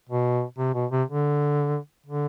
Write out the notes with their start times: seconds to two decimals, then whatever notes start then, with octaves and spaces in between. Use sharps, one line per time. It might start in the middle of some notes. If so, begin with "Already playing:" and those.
0.09 B2
0.58 C3
0.74 B2
0.91 C3
1.08 D3
2.06 D3